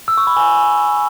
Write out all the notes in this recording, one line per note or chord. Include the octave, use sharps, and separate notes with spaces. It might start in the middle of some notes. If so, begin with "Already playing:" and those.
E6
C#6
B5
G#5